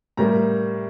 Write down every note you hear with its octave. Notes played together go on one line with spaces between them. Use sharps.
A2 G3 A#3 A#5